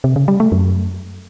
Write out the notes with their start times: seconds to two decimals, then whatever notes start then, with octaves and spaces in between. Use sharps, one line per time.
0.04 C3
0.16 C#3
0.28 G3
0.40 A3
0.52 F#2